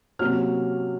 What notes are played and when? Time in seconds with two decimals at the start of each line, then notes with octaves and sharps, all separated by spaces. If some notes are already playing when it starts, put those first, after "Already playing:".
0.19 C3 F#3 A#3 C#4 F6